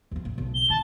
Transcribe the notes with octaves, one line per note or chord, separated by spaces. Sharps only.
E2 F3
A#2
B1
G7
D#3 A5